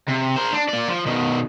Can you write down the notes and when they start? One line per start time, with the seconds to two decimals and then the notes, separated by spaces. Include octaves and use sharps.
0.09 C3
0.36 A#4 C5
0.53 D4
0.69 A#3 D5
0.88 F3
1.06 B2 D#3